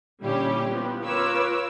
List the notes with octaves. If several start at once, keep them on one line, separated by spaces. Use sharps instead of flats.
A#2 D3 G3 C#4 E4 G4
F3 B3
F4 A#4 B4 C#5 D6 E6